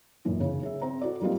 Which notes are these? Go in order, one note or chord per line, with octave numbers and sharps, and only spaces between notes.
F#2 A#2 D#3 E3
C#3
G#4 E5
C4 C5 A#5
E4 F#4 A4 D5
F#3 G3 A#3 C4 D#4 F4